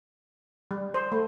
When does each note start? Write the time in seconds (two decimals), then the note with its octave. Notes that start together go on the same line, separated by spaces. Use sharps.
0.71 G3
0.94 C5
1.12 A3